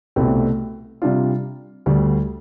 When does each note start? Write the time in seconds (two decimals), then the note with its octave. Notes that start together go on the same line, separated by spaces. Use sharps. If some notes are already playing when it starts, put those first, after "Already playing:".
0.16 C2 B2 A3 C4 G4
1.02 C3 G3 D4 F4
1.86 D2 D3 G3